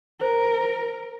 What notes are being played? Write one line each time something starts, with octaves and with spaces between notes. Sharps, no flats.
A#4 C5